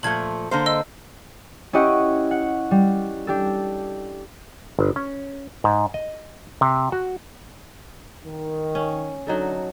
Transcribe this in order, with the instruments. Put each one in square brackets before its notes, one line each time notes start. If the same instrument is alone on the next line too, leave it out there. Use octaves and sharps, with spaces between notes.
[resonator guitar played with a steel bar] A#2 F3 A3 [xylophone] G#6 F#7
[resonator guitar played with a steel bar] D3 A#3 C5
[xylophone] D#5 E6 G7
[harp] C#4 E4 G4 D#5 F#5 C#6
F#5
G3
D4 G4 A4
[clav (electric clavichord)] G1
C#4
G#2
D#5
C3
F#4
[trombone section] D#3
[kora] C#4
[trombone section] D3 [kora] F#3 D#4 A4